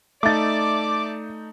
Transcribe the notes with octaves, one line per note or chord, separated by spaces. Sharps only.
A3 D#4 D5 E5 A5 D6 A6